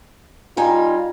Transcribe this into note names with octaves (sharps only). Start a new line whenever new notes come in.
G3 D#4 F4 G#5